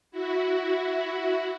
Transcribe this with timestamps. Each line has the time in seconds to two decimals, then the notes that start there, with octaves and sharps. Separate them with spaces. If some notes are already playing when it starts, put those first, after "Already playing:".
0.11 E4 F#4